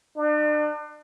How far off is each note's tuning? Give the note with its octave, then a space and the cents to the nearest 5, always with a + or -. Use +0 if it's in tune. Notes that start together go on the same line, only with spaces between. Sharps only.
D4 +40